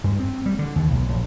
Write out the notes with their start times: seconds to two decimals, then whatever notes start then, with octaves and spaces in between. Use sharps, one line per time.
0.04 G2
0.20 C4
0.46 G3
0.59 D3
0.76 D#2
0.90 B1
1.09 A#1